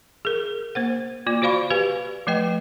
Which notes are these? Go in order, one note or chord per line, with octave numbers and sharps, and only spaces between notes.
G#4 A#4
A#3 C5 F#5
A#3 F4 D5
F#4 C5 D5 F5 B5 C#6
G4 B4 F5 G#5
F3 A3 B4 D#5 G5